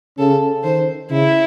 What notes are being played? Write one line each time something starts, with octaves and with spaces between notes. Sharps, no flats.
C#3 A4
D#3 C5
C#3 E4